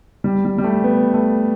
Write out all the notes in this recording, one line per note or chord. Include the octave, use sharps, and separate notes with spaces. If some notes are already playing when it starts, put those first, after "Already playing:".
G3
G3
G3
A3
B3
A3